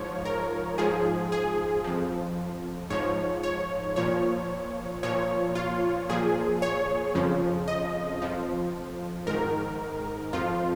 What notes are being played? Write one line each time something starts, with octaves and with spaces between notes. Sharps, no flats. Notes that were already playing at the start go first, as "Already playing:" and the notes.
Already playing: G#2 F3 C#5
A#4
G#2 F3 G#4
G#4
F2 F3
G#2 F3 C#5
C#5
A#2 F3 C#5
A#2 F3 C#5
F4
A#2 F3 G#4
C#5
F2 C#3 F3
D#5
F2 F3
G#2 D#3 A#4
F2 F3 F4